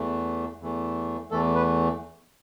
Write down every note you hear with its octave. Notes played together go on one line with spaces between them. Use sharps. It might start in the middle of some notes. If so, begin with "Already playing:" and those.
Already playing: E2 E3 A3
E2 E3 A3
E2 E3 A3 A4
B4